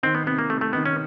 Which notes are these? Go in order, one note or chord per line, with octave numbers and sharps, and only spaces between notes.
D#3 C4
B3
C3 B3
A#3
C3 A3
A3
D#3 B3
C#4